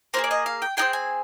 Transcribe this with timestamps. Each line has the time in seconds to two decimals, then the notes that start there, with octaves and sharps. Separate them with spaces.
0.14 A#3 F4 G#4 C5
0.24 D5
0.31 D#5
0.46 F5
0.62 G5
0.77 C4 D#4 G#4 G5
0.93 G#5